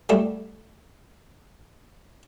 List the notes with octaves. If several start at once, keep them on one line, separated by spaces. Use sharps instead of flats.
F#3 G3 A3